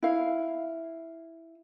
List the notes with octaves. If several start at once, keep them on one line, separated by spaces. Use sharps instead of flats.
E4 F5